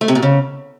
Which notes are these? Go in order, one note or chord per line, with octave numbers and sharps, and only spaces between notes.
A3
C3
A#2
C#3